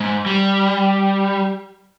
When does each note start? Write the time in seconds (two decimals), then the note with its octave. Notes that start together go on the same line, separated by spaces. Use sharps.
0.01 G#2
0.26 G3